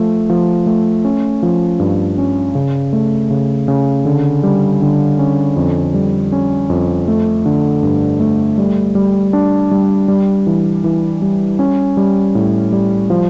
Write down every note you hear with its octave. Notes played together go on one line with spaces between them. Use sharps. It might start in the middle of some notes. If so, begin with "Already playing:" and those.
Already playing: F3 A3
F3
A3
C#4
F3
G2
C#4
C#3
A3
C#3
C#3
D3
G3
D3
C#4
F2
G3
C#4
F2
A3
D3
G2
A3
G3
G3
D4
G3
G3
E3
E3
G3
C#4
G3
A2
G3
F3